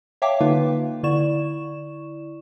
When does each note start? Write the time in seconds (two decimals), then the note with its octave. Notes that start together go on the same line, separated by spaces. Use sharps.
0.22 C#5 E5 F5 G5 A5 D6
0.40 D3 A#3 D#4 F4 B4 F5
1.03 D3 E4 D5 C#6 E7